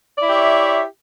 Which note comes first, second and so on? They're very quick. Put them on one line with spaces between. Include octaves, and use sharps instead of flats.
D5 E4 G4 E5 C#5